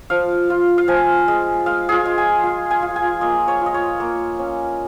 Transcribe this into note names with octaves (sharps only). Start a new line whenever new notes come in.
F3 F5
F4
F5
F3 G#5
G#3
G#3 F5
F4 G#4
G#3
G#5
F4
G#5
F4
G#5
A#3 D#5
C#5
F4 D#5
C#5
A#3
C#4